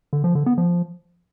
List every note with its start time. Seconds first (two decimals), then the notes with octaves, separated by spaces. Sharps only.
0.13 D3
0.24 F3
0.35 D3
0.46 B3
0.58 F3